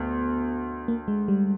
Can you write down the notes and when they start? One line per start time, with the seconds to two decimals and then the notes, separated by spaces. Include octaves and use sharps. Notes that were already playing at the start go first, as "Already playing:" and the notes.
Already playing: D2 B3
0.88 A#3
1.08 G#3
1.28 G3